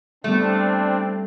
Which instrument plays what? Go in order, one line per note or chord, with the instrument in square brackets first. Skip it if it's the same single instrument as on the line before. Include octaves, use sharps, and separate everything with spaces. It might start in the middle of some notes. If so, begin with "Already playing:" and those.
[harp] G3 B3 [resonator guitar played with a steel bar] A3 [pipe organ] C4 D4